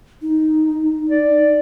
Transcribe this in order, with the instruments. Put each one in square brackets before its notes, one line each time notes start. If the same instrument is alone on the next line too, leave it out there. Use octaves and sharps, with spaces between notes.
[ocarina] D#4
[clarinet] D5